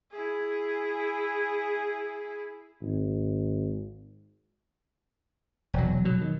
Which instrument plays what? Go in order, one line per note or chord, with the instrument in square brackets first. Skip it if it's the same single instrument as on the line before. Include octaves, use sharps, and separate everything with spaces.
[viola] E4 G#4
[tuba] G#1
[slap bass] E1 F#3
B2 F#3
D#3